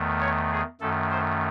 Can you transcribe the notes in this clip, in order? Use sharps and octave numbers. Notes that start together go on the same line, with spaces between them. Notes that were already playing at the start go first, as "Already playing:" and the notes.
Already playing: E2 D#3 A3
C#5
G#4
F#2 D#3 A3 A4
C5